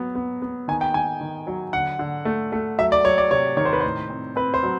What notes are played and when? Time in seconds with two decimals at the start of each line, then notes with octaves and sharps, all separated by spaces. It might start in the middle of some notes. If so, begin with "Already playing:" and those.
Already playing: F#3 B3
0.15 B3
0.42 B3
0.68 D#3 G#5
0.81 G5
0.94 D#3 G#5
1.21 D#3
1.47 F#3
1.73 D3 F#5
1.99 D3
2.25 A3
2.52 A3
2.78 F#3 E5
2.92 D5
3.04 F#3 C#5
3.18 D5
3.31 C3 C#5
3.57 D#3 C#5
3.65 C5
3.73 B4
3.81 A2 C5
4.10 C4
4.36 C4 B4
4.54 C5
4.63 F#3